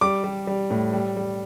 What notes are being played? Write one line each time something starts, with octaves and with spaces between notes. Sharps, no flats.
G3 D6
G3
G3
A2
G3
G3